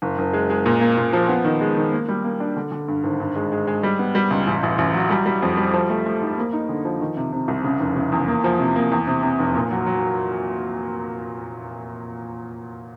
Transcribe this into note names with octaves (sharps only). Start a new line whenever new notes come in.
F#1
F#1
G#3
G#3
A#2
A#3
A#2
F3
B3
D#3
G#3
D#3
A#3
G3
A#3
D4
D3
D3
G2
G#1
G2
G#3
G#3
G#3
G3
B3
G3
C#2
A1
A1
A1
F#3
G3
G3
F2
G3
F3
A3
A3
G#2
A#3
D#4
D3
F3
D#3
C3
C3
C2
C#3
F1
C#3
E2
A#3
F3
C3
A#3
E2
C3
C3
F1
A#2
F#3
F#3